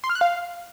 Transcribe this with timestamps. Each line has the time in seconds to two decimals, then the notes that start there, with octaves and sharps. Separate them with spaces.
0.04 C6
0.09 F6
0.15 F#6
0.21 F5